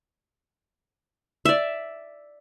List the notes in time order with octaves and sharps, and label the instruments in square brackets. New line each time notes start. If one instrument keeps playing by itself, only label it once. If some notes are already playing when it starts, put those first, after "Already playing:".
[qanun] D5 E5